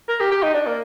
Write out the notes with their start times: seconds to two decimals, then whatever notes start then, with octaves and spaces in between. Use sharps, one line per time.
0.08 A#4
0.20 G4
0.31 G4
0.43 D#4
0.54 D4
0.67 A#3